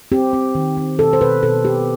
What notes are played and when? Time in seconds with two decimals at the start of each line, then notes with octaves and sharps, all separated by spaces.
0.12 C4 G4
0.33 C4
0.55 D#3
0.77 C4
0.99 B2 A4
1.13 C5
1.21 B2 B4
1.43 B2 A4
1.65 B3 G4